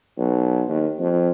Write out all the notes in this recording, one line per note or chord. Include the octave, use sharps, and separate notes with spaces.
B1
D#2
F2